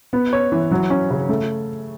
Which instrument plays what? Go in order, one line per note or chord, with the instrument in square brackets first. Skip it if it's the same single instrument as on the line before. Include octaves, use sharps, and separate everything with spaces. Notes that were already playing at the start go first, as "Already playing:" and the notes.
[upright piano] B3
C#5
E3
F#3
C#4
C#3
A3